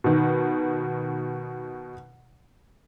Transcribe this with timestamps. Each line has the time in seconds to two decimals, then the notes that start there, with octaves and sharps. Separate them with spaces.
0.04 B2 D#3